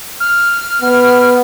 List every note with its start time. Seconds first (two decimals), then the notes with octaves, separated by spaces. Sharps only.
0.20 F6
0.82 B3